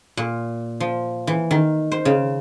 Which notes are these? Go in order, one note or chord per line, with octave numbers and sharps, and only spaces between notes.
A#2
F3
E3
D#3
C5
C#3